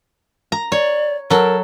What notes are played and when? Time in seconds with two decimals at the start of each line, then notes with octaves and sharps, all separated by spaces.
0.52 A#5
0.72 C#5 D5
1.30 F#3 A4 A#4